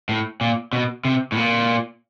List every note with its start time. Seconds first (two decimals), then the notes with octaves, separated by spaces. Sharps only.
0.09 A2
0.41 A#2
0.73 B2
1.05 C3
1.32 A2
1.37 A#2